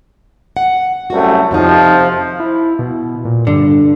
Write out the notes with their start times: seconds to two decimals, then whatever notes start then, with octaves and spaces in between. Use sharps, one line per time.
0.57 F#5
1.10 C2 F#2 A3 F#4
1.51 F2 C3 D#3 F3 D#4
2.40 E4
2.79 B2
3.25 A#2
3.47 G2 D3